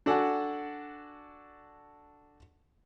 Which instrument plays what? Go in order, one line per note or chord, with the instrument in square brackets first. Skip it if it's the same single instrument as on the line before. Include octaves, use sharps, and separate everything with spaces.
[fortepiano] D4 F#4 A4 F#5 G#5